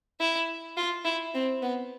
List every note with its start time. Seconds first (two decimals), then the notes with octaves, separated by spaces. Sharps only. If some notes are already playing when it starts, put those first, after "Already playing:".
0.20 E4
0.77 F4
1.05 E4
1.34 C4
1.62 B3